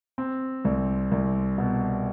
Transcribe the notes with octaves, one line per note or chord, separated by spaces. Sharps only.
C4
C2
C2
B2